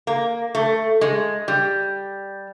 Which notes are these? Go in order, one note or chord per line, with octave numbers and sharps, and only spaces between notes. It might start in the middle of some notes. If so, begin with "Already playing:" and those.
A#3
A3
G#3
G3